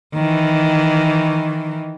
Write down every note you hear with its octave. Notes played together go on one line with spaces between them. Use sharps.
D#3 E3